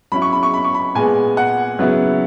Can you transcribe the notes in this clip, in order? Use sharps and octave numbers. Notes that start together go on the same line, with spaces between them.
F#3 C#4 E4 B5
C#6
B5
C#6
B5
C#6
B5
A#2 G#3 B3 G#5
F#5
C#3 F#3 B3 E4